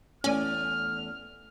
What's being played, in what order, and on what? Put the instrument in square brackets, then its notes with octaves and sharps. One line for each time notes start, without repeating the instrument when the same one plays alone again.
[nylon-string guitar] E2 A3 D5 [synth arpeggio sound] C#4 G#5 [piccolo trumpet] F6